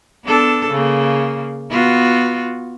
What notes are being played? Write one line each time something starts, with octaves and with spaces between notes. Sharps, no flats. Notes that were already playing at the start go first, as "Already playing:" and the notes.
B3 D4 A4
C#3 A#3
B3 F4 F#4